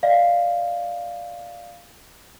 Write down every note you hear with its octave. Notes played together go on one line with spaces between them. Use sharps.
D5 D#5 F5